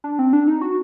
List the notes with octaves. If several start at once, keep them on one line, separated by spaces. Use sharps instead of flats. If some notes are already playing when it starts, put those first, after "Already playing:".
D4
C4
D4
D#4
F#4